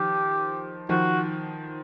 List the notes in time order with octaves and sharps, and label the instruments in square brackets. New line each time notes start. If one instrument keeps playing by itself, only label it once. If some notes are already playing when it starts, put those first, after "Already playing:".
Already playing: [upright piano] D#3 F3 [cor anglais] G4
[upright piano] D#3 F3 [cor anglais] F#4